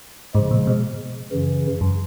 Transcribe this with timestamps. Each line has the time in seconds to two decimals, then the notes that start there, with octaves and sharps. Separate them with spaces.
0.35 G#2 C#3 F3 G#3
0.51 A#2
0.67 B2
1.32 F#2 C#3 E3
1.81 F#2